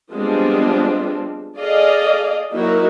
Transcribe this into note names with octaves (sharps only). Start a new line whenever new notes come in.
F3 G3 G#3 B3 C4 D4
G#4 A4 D5 D#5 F5
F#3 A#3 D#4 E4 F#4 A#4